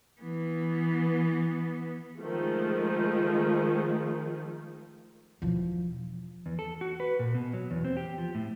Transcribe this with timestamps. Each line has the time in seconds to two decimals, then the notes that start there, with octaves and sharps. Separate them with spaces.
0.21 E3 B3
2.18 D#3 F3 G#3 A3
5.42 E1 F3
6.46 E2
6.59 A4
6.81 F#4
7.00 B4
7.19 A#2
7.35 B2
7.53 F#3
7.71 E2
7.85 C4
7.97 G4
8.18 F3
8.35 A2